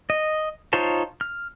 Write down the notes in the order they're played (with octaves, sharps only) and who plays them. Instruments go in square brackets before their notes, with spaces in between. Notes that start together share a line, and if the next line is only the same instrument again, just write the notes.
[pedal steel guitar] D#5
D#4 F4 C5 C#5 A5
F6